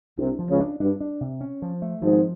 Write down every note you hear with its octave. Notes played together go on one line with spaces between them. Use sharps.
C2 C3 D4
F3
C#2 C#3
D4
G2 D4
D4
C3
C#4
F3
A3
G#1 G#2 F3